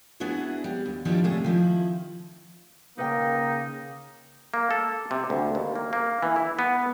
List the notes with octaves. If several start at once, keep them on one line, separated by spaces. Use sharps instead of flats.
B3 D4 E4 F#4 G#4
G3
D#2
D#3 F3 G3 D4 E4 F4
A2 C3 A3 G#4
D#3 F3 E4
C#3 A#3 D#4 B4 G5
A#3
A4
C3
D2
D#2
A#3
A#3
E3
E4
B3